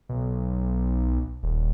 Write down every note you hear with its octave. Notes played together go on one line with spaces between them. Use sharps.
B1
D#1